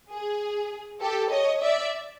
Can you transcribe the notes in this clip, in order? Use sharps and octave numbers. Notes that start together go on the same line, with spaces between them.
G#4
G4 A4
C#5 D#5
D5 E5